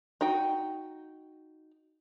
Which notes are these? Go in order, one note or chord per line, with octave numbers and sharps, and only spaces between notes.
D#4 F#4 G5